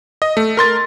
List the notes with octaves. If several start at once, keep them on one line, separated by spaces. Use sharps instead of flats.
D#5
A3
A#4 C6 A6